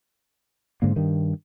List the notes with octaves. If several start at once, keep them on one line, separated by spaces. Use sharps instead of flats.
G#2 D3 A#3
G2 D#3